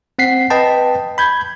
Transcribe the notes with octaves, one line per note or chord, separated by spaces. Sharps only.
C4 F#5 B6 C7
B4 D#5 G5 A5
B5 G6 G#6